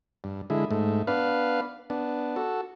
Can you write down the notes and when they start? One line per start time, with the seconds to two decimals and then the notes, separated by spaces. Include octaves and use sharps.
0.24 G2
0.50 D3 G#3 E4
0.71 G#2 A3
1.07 B3 D4 B4 F5
1.90 B3 D4
2.36 F#4 A4